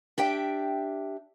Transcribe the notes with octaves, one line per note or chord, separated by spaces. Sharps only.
D4 G4 E5 G5